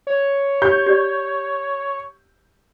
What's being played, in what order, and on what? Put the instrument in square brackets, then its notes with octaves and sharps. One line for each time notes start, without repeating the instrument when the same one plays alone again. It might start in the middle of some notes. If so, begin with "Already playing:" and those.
[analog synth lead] C#5
[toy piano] G4 [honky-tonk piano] G6
[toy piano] G4 D5